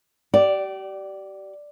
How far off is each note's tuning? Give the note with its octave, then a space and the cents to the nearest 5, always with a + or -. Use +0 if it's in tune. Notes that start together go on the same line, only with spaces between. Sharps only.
G4 -35 D5 +0